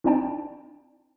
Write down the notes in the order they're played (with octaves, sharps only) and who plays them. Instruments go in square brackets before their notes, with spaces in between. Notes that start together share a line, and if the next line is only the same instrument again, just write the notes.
[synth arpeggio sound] C4 D4 D#4 D5 G5 A5